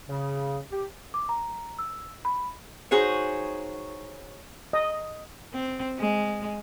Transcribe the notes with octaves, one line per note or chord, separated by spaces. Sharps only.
C#3
G4
D6
A#5
E6
B5
D#4 F#4 G#4 C5 C#5
D#5
C4
G#3